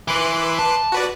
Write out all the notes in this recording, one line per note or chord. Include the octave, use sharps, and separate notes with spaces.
E3 B4 C6 D6
A5
F#4 B4 D5